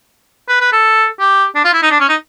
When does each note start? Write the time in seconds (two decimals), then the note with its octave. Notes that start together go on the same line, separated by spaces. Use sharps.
0.48 B4
0.61 B4
0.73 A4
1.20 G4
1.56 D4
1.65 F4
1.74 E4
1.83 D#4
1.91 D4
2.00 C#4
2.09 D#4